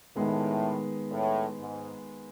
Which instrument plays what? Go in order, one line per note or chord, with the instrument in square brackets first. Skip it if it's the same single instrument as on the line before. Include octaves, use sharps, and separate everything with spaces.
[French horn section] A2 [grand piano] D#3 G#3 B3
[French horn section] A2
G#2